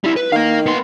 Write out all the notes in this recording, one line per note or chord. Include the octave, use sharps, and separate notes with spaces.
G3 E4
B4
D#3 A#4 F5
B3 C6